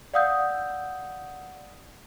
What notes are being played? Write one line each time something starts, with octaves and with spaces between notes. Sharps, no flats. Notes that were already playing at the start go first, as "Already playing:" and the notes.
D5 F5 F#5 D#6 E6 G6